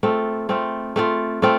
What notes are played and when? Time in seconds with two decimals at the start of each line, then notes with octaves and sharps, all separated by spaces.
0.03 A3 C4 F4
0.49 A3 C4 F4
0.96 A3 C4 F4
1.42 A3 C4 F4